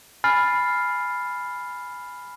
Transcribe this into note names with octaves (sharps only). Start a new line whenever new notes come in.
G#5 B5 F6 A6 C7